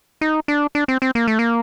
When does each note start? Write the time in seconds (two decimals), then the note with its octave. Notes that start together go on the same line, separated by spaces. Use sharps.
0.21 D#4
0.48 D4
0.75 D4
0.88 C4
1.02 C4
1.15 A#3
1.27 A3
1.39 A#3